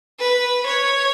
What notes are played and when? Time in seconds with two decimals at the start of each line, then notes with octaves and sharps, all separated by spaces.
0.19 B4
0.66 C#5